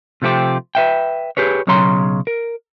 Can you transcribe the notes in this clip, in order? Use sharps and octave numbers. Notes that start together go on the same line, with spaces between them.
C3 F3 A3 C4 G4
B4 E5 G5
G4 G#4 B4 C#5
B1 C#3 F#3 C#5 A#5 C6
A#4